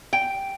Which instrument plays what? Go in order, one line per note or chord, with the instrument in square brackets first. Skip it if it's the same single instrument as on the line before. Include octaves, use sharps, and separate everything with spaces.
[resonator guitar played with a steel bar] G5